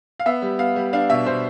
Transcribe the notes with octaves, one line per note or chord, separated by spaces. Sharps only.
F5
B3 E5
G3
B3 F5
G3
D4 F5
B2 E5
B2 C5